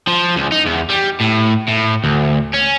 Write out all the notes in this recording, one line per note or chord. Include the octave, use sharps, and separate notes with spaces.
F3
C#2
D#4
E2
G3
A2
A2
D2
C#4